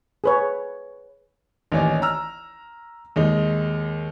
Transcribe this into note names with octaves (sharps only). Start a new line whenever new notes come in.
G#4 B4 C#5
A1 D#2 D#4 C#5 D5
A#5 E6 F6
D#2 G#3 D#4